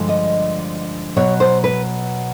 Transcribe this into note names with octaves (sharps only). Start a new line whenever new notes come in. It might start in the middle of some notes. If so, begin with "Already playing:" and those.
Already playing: G2 D3 F3 G#3
D#5
B2 F#3 C#5
C5
B4